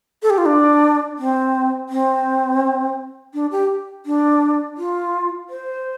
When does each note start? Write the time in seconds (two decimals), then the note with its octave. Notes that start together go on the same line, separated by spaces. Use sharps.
0.22 A4
0.30 G4
0.38 F4
0.46 D4
1.18 C4
1.89 C4
3.34 D4
3.51 G4
4.06 D4
4.77 F4
5.50 C5